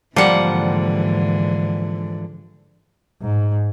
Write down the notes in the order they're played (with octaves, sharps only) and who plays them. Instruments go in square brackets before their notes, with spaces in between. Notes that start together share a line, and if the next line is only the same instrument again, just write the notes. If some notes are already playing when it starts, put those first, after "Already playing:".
[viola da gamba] G#2 D3 E3 [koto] F3 F#5 [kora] G3 A#3
[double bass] G#2